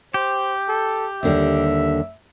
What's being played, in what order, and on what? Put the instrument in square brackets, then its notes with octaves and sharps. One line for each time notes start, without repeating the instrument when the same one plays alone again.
[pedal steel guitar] G4 [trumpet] C5
[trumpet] A4
[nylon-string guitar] D#2 D3 G3 [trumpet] E5